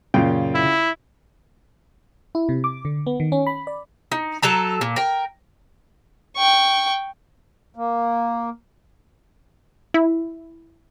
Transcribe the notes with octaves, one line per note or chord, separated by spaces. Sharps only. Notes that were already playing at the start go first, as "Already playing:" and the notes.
F#2 A#2 C#3 F4 G5
E4
E4
C3
D6
D3
B3
D#3
C#4
B5
D5
D#4
F#3 A4 A5 A#5
A#2
A#4 G5
G5 C#6
A#3
E4